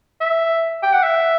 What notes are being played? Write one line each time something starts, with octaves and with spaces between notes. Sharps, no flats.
E5
G5
F#5
E5